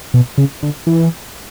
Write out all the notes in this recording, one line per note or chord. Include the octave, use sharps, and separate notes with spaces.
B2
C#3
D3
E3